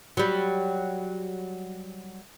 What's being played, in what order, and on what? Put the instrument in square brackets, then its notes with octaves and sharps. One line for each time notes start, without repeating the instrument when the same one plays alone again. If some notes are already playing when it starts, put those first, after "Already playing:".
[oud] F#3 G3